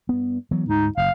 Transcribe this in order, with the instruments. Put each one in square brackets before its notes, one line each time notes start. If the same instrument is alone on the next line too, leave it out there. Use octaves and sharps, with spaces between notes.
[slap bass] G2 B3
E3 F#3 B3
[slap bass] D2 G#2 [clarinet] D#4
[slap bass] F#1 [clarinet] F5